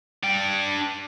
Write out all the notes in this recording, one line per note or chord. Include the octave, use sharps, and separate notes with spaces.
D4 G5